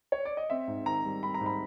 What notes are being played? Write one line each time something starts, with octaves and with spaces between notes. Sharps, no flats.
C#5
D5
D#5
C4 E5
G#2
D#3 A#5
G3
C4 B5
A#5
G#2
B5